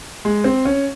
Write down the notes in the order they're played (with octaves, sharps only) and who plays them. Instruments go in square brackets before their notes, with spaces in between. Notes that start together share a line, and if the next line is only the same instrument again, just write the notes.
[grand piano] G#3
C4
C#4